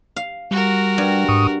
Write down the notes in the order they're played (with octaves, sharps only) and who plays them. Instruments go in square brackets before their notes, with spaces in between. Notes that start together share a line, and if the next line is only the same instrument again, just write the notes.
[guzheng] F5
[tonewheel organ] G3 [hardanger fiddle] F#4 A#4
[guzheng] G2
[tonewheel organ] G#2 C#6 D#6